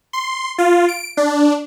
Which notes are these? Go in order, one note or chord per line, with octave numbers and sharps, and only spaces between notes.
C6
F4
D7
D4